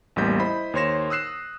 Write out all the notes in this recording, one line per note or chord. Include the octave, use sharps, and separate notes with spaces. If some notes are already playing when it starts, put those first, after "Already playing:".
A1 E2 G3 A#3 G6 B6
E4 C5 D#5 B5
D#2 C5 C#5 C6 A#6 E7
D#6 E6 F#6 C7 E7